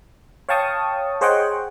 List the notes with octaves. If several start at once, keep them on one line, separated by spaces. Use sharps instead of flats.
C#5 F5 G5 A5 C#6 D#6
G#4 C5 C#5 D#5 F#5 G5